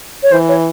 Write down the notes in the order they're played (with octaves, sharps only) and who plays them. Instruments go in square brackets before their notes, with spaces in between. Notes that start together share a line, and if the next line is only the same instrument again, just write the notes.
[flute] C#5
[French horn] E3 [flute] C5
[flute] C#5